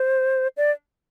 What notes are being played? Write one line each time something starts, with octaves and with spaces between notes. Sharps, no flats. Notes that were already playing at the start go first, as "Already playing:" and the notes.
Already playing: C5
D5